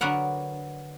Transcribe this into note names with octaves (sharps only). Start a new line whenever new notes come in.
D3 F#3 B3 A#4 F#5